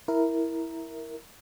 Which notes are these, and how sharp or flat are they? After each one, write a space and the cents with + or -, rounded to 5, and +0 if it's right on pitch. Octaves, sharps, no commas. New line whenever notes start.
E4 -5 A#4 +0